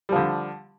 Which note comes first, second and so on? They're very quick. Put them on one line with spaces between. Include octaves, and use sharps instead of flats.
G3 F3 D3